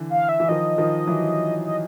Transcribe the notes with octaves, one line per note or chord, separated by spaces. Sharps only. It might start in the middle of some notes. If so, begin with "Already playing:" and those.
Already playing: D3 E3
F5
E5
E3
D#3 F3 D#5
D#3 F3
E3 F#3
D#5